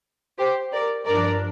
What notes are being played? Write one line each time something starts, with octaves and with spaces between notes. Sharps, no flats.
G4 C5
A#4 D5
G2 F3 D4 A#4 D5